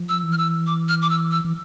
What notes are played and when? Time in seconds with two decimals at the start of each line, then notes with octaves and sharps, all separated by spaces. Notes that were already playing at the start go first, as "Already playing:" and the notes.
Already playing: F3
0.09 E6
0.23 E3
0.32 F6
0.38 E6
0.67 D6
0.88 F6
1.02 D6
1.10 E6
1.31 E6
1.45 E3